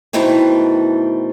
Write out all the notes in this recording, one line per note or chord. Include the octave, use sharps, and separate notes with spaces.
B2 D#3 E3 A3 C4